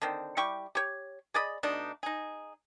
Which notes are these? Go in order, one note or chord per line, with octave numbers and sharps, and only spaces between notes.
D3 D#3 C4
G3 E4 G4 C#6
G4 C#5
G#4 D5 D#5 B5
B2 A3 D4 D#4
D#4 G#4